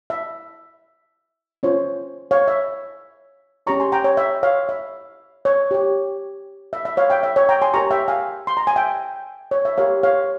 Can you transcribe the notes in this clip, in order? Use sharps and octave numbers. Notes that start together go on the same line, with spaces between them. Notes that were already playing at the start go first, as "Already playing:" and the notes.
E5
C#4 F4 C5 C#5
C#5 F5
E5
C#4 G4 C#5 A#5 C#6
G#5 C6
G5 A#5
C#5
E5
C#5 F5
E5
C#5
G4 C#5
E5
E5
C#5 F5
E5 G5
E5
C#5
G5 A#5
G#5 C6
G4 A#4 C#5 A#5 C#6
E5 G5
F5 G#5
C6
A#5
G#5
E5 G5
C#5
E5
G4 A#4 C#5 F5
C#5 F5